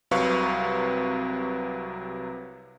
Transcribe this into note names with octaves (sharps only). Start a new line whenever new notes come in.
C2 C3 F#3 B4 F5 C#6